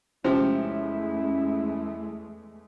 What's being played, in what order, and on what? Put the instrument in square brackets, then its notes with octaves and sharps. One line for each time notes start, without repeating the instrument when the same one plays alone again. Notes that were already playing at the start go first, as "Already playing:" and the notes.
[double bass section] E2 G#3 A3 [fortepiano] C3 F3 [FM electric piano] C#4 [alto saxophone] E4